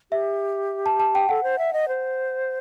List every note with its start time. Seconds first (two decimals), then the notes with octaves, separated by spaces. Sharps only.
0.12 G4 E5
0.86 A5
1.00 A5
1.15 G5
1.29 A4 F#5
1.43 C5
1.58 E5
1.73 D#5
1.88 C5